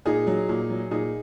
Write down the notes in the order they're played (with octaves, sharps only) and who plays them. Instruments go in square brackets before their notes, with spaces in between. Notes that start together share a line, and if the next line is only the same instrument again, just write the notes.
[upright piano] A#2 D#4 G#4
F#3
A#2
F#3
A#2 D#4 G#4